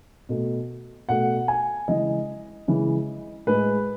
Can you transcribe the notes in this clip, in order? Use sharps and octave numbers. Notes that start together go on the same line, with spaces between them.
B2 A3
B2 A3 F#5
G#5
C#3 E3 G#3 D#5
C#3 E3 G#3
A2 G#3 B4